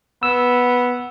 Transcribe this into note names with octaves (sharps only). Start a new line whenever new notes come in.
B3 E6